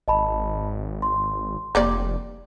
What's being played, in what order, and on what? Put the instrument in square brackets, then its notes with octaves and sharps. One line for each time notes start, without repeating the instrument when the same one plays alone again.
[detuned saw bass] G#1 [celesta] D#5 A5 B5
[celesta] C6
[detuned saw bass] F1 [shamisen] G3 A#3 D5